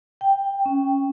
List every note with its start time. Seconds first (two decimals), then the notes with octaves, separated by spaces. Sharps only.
0.21 G5
0.66 C#4